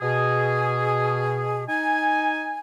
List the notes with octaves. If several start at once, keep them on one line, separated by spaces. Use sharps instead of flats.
B2 G#4
D#4 G#5